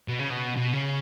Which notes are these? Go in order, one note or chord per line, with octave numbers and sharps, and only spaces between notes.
B2
C#3
B2
B2
C#3